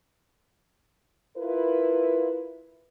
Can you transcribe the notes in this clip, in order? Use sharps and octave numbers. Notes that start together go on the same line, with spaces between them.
E4 F4 A#4 B4